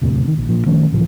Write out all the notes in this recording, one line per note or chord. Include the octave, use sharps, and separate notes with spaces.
E1 D2 A2 C3
C3 D#3
A#1
A#2 F3
D#3 F3 A3 C#4
C#2 A2 E3 F3